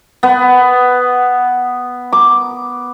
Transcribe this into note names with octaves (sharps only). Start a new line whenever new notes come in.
B3
D6